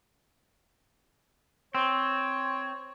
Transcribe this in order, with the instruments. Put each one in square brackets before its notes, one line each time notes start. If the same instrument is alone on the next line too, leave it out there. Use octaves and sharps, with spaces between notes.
[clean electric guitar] C4 [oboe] C#5